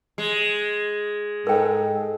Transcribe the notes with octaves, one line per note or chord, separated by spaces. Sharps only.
G#3
G#2 A4 A#4 G5